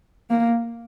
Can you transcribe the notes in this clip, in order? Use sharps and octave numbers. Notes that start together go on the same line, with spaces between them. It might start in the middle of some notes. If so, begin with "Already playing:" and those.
A#3